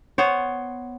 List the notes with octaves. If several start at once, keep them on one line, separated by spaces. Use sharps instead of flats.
B3 C5 C#5